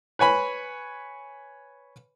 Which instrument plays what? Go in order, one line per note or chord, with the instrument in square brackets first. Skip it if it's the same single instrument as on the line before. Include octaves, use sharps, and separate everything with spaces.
[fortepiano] B4 C#5 G#5 B5